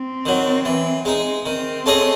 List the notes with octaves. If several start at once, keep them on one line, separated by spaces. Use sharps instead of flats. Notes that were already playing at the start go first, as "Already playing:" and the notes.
Already playing: C4
D#3 F#3
E3
G#3 D#4
D#3 C4
A3 C#4 G#4 D#5